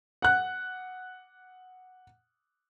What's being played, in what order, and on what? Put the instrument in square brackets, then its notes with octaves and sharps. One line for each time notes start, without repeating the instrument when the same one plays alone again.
[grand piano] F#5 F#6